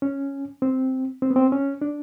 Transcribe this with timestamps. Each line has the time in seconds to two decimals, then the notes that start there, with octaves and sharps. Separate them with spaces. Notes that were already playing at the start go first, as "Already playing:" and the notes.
0.02 C#4
0.62 C4
1.22 C4
1.31 B3
1.36 C4
1.52 C#4
1.82 D4